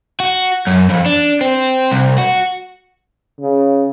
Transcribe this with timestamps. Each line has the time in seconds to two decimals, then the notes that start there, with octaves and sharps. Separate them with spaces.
0.20 F#4
0.67 F#2
0.90 F2
1.06 D4
1.41 C4
1.91 C2
2.18 F#4
3.41 C#3